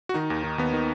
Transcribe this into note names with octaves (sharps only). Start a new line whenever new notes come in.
F#4
D#3 D#4
D#2
D#3
D#2 B3
D#3